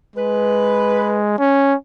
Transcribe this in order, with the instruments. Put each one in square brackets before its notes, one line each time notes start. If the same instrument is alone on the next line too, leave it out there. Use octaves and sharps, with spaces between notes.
[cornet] G#3 [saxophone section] B4
[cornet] C#4